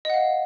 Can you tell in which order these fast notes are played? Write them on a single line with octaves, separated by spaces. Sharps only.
D#5 F#5 F5